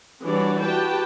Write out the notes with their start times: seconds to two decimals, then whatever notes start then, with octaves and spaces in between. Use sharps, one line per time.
0.25 E3 G3 D4 F#4 C#5 D5
0.61 F#4 G4 B4 G5 A5